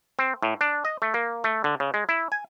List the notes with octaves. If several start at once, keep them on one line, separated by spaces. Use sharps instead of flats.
C4
A2
D4
D#5
A3
A#3
A3
D3
C#3
G#3
E4
G#5